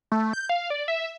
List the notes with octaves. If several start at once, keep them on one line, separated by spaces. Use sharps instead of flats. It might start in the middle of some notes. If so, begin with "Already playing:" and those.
A3
G6
F5
D5
E5